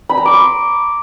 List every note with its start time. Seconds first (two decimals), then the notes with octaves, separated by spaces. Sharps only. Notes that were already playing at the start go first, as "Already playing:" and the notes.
0.09 B5
0.17 A#5
0.25 D6
0.33 C6